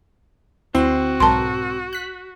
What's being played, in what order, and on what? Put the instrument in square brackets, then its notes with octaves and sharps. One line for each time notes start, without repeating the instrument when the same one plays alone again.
[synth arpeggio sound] D2 E4 C6 [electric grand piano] C4 [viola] F#4
[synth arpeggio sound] B1 G#2 A#4 [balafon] A5 C6
[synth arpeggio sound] F#6 B6